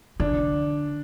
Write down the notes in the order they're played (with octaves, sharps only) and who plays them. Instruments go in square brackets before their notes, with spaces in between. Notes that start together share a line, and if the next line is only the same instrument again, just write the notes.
[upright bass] D3 [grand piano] D4